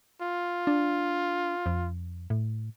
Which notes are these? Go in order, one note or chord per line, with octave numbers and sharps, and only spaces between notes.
F4
D4
F2
A2